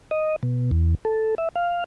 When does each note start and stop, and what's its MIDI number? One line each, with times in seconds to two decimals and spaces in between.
0.11 0.36 75
0.43 0.71 47
0.71 0.95 40
1.05 1.35 69
1.38 1.49 76
1.56 1.84 77